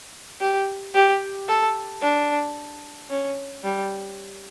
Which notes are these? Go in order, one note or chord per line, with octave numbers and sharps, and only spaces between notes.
G4
G4
A4
D4
C#4
G3